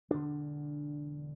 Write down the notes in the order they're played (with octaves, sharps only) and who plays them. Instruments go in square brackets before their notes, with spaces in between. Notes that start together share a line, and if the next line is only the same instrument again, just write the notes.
[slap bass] E1 E2 D3 D4